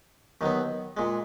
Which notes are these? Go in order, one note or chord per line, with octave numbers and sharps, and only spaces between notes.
D#2 D#3 F#3 B3
A#2 G#3